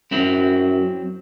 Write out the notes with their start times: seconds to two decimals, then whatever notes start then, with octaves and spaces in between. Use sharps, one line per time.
0.11 F#2 F#3 C4 E4